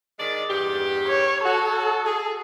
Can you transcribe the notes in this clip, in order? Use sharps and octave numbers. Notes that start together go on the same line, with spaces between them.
D#3 G#3 D5
E2 G2 G4
C#5
F#4 A4
G#4